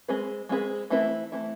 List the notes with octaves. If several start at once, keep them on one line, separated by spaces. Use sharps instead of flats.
G#3 C4 G#4 B4
G#3 C4 G#4 B4
E3 A3 C4 E4 B4
E3 A3 C4 E4 B4